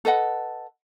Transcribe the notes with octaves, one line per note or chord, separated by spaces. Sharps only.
A4 B4 D#5 F#5